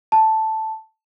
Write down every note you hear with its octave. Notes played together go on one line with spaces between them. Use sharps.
A5